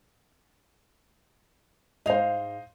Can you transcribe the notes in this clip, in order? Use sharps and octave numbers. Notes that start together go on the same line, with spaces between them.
G#2 C5 D#5 F5